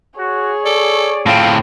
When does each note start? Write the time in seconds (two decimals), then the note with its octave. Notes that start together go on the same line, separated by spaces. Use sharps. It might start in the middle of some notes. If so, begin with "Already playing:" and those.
0.19 F#4 G#4 C#5
0.65 A4 D5
1.26 A2 C4 F4